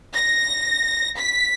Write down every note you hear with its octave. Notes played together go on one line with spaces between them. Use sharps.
A#6
B6